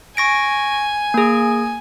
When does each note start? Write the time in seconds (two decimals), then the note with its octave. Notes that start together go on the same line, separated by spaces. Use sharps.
0.17 G#5 C#6 A#6 D7
1.14 A#3 G#4